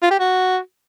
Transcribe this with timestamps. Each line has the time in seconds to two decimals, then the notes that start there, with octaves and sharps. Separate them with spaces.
0.03 F4
0.11 G4
0.20 F#4